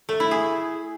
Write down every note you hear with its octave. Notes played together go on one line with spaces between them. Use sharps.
A3
E4
G#4